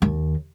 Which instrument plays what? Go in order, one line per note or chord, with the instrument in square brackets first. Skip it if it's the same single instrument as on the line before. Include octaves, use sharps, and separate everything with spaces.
[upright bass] D#2